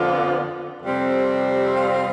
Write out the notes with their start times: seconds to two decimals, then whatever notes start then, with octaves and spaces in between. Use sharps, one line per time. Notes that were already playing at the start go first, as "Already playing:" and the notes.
Already playing: F2 D3 F3 B3 F4
0.83 F2 C3 G3 C4
1.74 F4